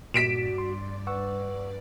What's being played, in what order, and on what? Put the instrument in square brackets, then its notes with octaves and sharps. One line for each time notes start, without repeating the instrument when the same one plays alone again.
[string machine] G2 D5 [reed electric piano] A#2 [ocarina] F#4 [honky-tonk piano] B6 D7 E7
[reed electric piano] C6
[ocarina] B4 [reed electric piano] F#5 C#6 E6